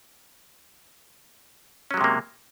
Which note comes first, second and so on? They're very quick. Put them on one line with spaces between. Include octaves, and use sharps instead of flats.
C#4 F#3 G#3 C3 A#3